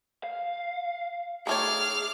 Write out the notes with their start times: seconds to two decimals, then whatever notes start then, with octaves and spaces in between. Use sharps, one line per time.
0.24 F5
1.47 D#3 A3 G#4 C#5 D6 F6